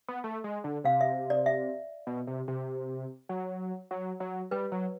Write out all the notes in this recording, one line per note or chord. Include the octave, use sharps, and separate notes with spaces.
B3
A3
G#3
D3
C3 F5
E5
D5
E5
B2
C3
C3
F#3
F#3
F#3
G3 B4
F#3